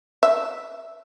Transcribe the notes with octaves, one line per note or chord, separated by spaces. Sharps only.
E5